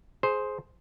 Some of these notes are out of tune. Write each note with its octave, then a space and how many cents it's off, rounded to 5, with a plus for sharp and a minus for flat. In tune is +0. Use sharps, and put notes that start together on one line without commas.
G#4 +20 C5 +0